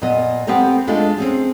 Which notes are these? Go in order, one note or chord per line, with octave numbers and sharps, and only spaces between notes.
A#2 B3 D#5
B3 C4 G4 A4 A#4
G#3 A3 D4 D#4 F4 A4
C4 C#4 G#4